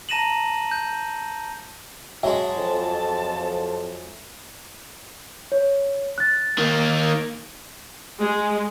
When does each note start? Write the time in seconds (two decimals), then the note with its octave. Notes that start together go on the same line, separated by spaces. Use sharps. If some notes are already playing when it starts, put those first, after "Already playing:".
0.09 A5 A#5 A#6 D#7 E7 F#7
0.71 G6
2.23 F#3 G#3 E5 A5
2.56 F2
5.52 C#5
6.18 F#6 A6
6.58 D#3 A#3
8.20 G#3